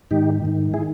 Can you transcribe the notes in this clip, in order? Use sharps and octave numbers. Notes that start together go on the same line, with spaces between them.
G#2 D#3 D#4 G4
G#2 D#3
E4 G#4
D#3